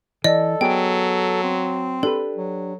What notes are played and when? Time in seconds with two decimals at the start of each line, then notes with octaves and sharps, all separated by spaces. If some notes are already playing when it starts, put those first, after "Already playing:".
0.24 E3 A4 D5 D#5
0.61 F#3 B3 G#4 G5
1.42 C4
2.03 D4 G4 A4 B4
2.36 F#3